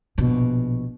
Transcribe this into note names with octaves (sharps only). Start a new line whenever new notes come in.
A#1 B2